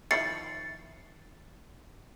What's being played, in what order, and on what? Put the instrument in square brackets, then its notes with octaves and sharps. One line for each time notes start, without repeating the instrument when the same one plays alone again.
[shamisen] D#3 F3 E4 [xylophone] A6 C7 C#7